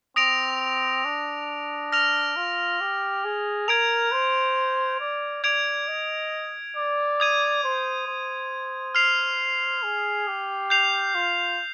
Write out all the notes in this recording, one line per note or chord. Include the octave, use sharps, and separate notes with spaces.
C4 D#6 A#6 D7 F7
D4
F6 A#6 F7
F4
G4
G#4
A#4 G#6 D7 F7
C5
D5
D5 G#6 D7 F7
D#5
D5
D#6 G#6 D#7
C5
C5
F6 C7 F7
G#4
G4
G6 C7 F7
F4